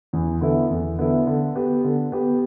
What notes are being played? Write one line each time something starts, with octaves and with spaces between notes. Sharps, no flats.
E2
D3 B3 E4
E2
D3 B3 E4
D3
B3 G4
D3
B3 G4